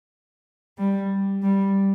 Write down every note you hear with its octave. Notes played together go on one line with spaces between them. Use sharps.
G3
G3